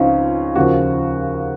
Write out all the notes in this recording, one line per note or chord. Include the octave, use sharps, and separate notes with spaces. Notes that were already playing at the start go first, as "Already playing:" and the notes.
Already playing: C#2 C#3 F3 C4 C#4 D#4 F4
D#2 C#3 F3 F#4